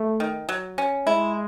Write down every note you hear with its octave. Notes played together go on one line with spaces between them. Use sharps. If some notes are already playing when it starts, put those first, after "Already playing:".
Already playing: A3
D#3
F#3
C#4
G#3 E4